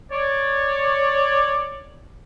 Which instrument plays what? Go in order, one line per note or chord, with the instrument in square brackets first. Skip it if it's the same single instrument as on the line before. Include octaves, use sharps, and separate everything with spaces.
[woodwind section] C#5 D5